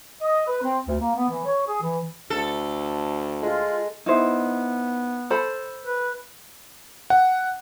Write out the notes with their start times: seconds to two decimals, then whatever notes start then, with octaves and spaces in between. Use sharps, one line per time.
0.21 D#5
0.47 B4
0.63 C4
0.88 D2
1.01 A#3
1.16 B3
1.30 E3
1.46 C#5
1.68 G#4
1.83 E3
2.30 D2 A4
3.43 G#3 F4
4.06 B3 D#4 E4 C5
5.30 A4 C5 B5
5.85 B4
7.10 F#5